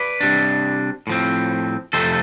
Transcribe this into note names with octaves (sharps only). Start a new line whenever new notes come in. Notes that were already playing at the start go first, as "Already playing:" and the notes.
Already playing: B4 D5
C3 G3 D4
A2 F3 C4
F2 C3 F3 A3 A4 C5